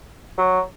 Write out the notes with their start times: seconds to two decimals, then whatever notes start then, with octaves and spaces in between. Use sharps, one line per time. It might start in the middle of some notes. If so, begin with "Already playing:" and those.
0.38 F#3